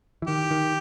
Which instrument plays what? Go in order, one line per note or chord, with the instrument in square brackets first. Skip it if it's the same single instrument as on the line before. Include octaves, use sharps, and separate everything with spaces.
[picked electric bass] E3
[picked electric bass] D#3 [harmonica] G4
[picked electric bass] D#3